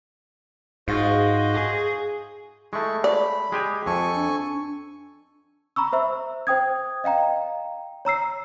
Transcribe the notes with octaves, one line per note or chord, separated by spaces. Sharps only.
G#2 G#3 F4 F#4 C5 D#5
G#4
G#3 A3 E4 C#6
D5 B5
G#3 G4 G#5
F2 A4 G#5 C#6
D4
A#5 B5 C#6 E6
C5 E5 E6
C5 G5 D#6 G#6
D#5 F5 G5 A#5
C#5 A#5 E6 C7